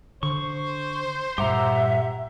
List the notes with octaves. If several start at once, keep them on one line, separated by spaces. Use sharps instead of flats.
D3 C5 C#6
G2 A#2 G4 E5 F#5 A#5